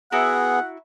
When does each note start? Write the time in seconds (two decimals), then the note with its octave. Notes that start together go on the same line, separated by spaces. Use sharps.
0.12 B3 E4 F#4 G#4 F#5 A#5